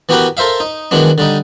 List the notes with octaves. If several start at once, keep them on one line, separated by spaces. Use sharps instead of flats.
E3 B3 F#4 G4 A#4 B4
A4 A#4 C5 E5 F5
D#4
D#3 E3 F#3 G#3 B3 D4
D3 G3 D#4